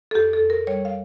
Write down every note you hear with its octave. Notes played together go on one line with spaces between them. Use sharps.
A4
F2 G4
A4
F2
A#4
G3 C#5
F5